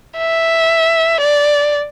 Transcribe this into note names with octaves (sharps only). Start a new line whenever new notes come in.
E5
D5